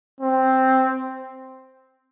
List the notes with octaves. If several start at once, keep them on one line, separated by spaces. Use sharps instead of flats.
C4